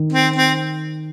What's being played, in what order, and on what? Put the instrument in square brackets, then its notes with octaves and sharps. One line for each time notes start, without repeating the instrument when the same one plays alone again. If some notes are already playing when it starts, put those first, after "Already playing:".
Already playing: [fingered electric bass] D#3
[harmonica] C4
C4